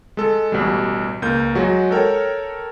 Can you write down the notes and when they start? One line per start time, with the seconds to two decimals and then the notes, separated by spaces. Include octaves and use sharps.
0.17 G#3 A4
0.52 A1 B2 G3
1.22 C#2 A#3 G6
1.55 F#3 G#3 F#4
1.91 A4 A#4 C#5 G5